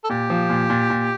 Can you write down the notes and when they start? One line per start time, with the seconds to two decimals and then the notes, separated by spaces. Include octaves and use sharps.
0.04 A4
0.09 A#2 G4
0.30 F3
0.49 A#2
0.70 A#2
0.90 A#2